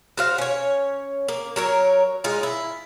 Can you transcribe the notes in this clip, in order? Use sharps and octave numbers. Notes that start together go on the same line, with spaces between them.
F#4 C5 F5
C#4 C#5
A#3
F#3 A#4 C#5
G#3 D#4 F4
E4